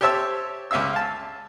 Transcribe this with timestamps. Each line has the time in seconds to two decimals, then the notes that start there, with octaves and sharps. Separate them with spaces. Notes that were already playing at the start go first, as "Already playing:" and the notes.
0.01 G4 C5 C#5 E5 A5 E6
0.71 C#2 C#4 E5 F5 E6
0.93 F5 A5